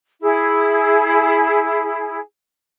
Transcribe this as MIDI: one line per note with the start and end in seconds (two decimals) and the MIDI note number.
0.22 2.18 64
0.22 2.18 68